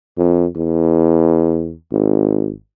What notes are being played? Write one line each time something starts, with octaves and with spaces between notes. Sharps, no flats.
F2
E2
G#1